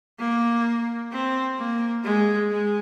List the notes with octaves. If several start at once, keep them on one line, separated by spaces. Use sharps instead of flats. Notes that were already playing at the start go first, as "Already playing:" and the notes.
A#3
C4
A#3
G#3
G#3